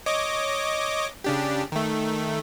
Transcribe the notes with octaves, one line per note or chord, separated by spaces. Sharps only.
C#5 D#5 D6
C#3 D4 G4
D#3 A3